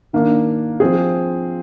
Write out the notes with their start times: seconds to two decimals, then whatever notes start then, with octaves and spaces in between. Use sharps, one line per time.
0.13 D#3 A#3 D4
0.80 F3 C4 G#4